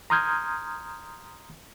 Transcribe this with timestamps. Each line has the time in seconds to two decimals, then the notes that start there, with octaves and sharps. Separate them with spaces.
0.10 A#5 C6 D#6 F6 G6 G#6